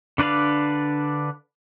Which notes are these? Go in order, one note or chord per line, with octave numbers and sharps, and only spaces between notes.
D3 D4 B4 D5 F5